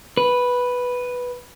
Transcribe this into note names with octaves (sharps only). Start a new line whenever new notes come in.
B4